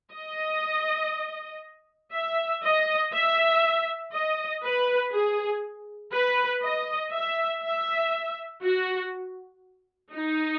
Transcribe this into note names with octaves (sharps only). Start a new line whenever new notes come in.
D#5
E5
D#5
E5
D#5
B4
G#4
B4
D#5
E5
E5
F#4
D#4